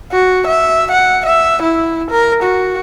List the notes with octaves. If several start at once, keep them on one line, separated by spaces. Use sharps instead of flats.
F#4
E5
F#5
E5
E4
A#4
F#4